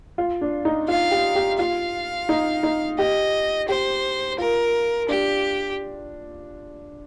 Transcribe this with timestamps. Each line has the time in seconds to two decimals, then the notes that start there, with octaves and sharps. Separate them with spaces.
0.18 F4
0.41 D4
0.65 D#4
0.88 F4 F5
1.11 G4
1.35 G4
1.58 F4 F5
2.29 D#4
2.63 D#4
2.98 G4 D#5
3.69 G4 C5
4.38 F4 A#4
5.09 D4 G4